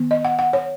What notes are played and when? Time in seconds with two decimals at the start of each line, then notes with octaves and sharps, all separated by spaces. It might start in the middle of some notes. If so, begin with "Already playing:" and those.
Already playing: D#3 B3
0.11 D#5
0.25 F#5
0.39 F#5
0.53 C#5